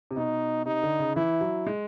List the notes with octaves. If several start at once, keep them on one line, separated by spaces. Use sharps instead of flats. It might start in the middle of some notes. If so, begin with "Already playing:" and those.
C3
B2 D#4
C3 D#4
D3
C#3
E3 E4
F#3
G#3